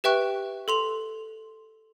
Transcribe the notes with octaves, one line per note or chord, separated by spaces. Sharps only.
G4 B4 E5 G5 C#6 F#6
A4 C6 F7